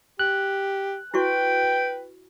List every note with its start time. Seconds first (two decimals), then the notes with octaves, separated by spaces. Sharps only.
0.19 G4 F#6
1.14 E4 F#4 B4 G5 C#6